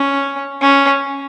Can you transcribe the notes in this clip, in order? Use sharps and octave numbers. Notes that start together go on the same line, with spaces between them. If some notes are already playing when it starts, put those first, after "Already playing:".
Already playing: C#4
C#4